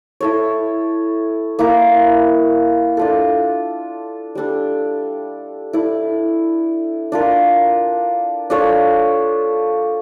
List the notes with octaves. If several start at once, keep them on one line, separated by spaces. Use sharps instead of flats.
E4 A4 C#5
A#3 E4 A#4
D4 F4 A4
G3 D4 A4
E4 A4 D5
D4 F4 A#4
D4 F4 A4 C#5